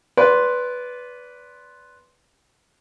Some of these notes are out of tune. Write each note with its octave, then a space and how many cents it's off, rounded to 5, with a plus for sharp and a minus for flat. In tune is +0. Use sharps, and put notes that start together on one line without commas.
B4 +0 D5 -25 C6 +0